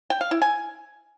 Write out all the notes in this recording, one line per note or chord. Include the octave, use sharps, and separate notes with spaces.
G5
F5
E4
G#5